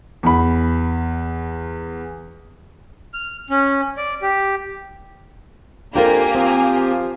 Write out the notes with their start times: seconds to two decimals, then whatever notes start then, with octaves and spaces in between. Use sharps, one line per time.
0.23 E2 B5
3.14 F6
3.50 C#4
3.97 D5
4.22 G4
5.96 F2 A#3 D4 F4 G4 A#4 G#5
6.35 F3 C4